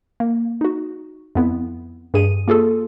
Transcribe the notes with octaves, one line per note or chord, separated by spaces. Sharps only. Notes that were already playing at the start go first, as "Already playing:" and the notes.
A#3
D#4 F#4
F2 B3 E4
G2 G#4 D#7
A#3 F4 G#4 A4